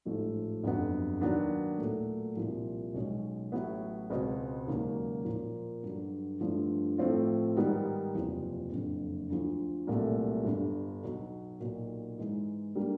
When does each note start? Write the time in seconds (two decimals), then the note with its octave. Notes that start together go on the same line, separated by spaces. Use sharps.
0.05 A1 G#2 F3 A3
0.63 G1 F2 D3 F#3 B3
1.21 D#2 D#3 F#3 B3 D4
1.78 A#2 F#3 A3
2.36 C2 A#2 F3
2.94 B1 B2 G#3 C#4
3.52 A1 A2 F#3 B3 E4
4.10 C#2 B2 G#3 C4
4.67 E1 D#2 C#3 F#3 A#3
5.25 A#2 F3 A#3
5.83 G2 D3 F#3
6.41 G2 D3 F3 A3
6.98 A2 F3 A3 C4 F4
7.57 G#2 D#3 G3 B3 D#4
8.14 F#1 E2 C3 F3
8.72 F#1 F2 D3
9.30 D2 D3 F3
9.87 C2 A#2 F#3 A3
10.45 G1 G2 D3
11.03 B1 B2 F#3
11.60 B1 A#2 F#3
12.18 G#2 E3 G#3
12.75 D3 G3 A#3